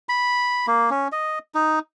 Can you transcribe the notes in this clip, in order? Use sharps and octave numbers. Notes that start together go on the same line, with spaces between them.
B5
A#3
C#4
D#5
D#4